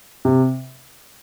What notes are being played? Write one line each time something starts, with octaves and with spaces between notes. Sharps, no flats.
C3